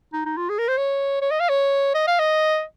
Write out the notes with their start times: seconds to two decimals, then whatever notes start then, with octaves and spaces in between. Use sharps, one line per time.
0.13 D#4
0.25 D#4
0.37 F4
0.49 G#4
0.59 A#4
0.68 C5
0.77 C#5
1.22 C#5
1.31 D#5
1.40 F5
1.49 C#5
1.95 D#5
2.07 F5
2.19 D#5